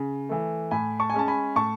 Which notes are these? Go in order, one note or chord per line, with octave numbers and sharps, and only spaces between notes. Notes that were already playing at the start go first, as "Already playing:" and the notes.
Already playing: C#3
E3 A3
A2 G#5 B5
A5 C#6
G#5
G#3 C#4 A5
G#5 B5
A2 A5 C#6